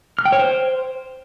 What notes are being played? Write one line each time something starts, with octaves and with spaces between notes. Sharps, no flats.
F6
G5
C#5
C5